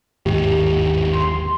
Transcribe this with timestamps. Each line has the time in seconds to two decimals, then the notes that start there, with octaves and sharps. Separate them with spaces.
0.26 G1 D#2 G#2 G4
1.14 C6